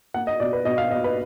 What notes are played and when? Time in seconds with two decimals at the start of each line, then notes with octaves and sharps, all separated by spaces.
0.14 A#3 F#5
0.27 D#5
0.40 B2 D5
0.53 B4
0.65 B2 D#5
0.78 F5
0.91 B2 D#5
1.04 B4